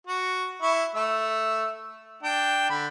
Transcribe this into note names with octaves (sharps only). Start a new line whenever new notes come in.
F#4
E4 C#6
A3 E6
D4 G5
D3 B5